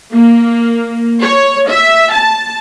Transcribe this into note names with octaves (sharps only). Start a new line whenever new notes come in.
A#3
C#5
E5
A5